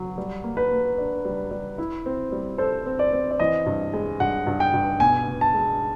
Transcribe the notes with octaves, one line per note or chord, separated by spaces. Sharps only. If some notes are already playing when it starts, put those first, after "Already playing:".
Already playing: F#3
G3
A#3
B4
A#3
D4
G3
G3
E4
C4
G3
A4 C5
C4
D5
C4
D5
E3 D#5
G2
G#3
G2 F#5
G2
G5
G2
B2 G#5
B2
A5
G#3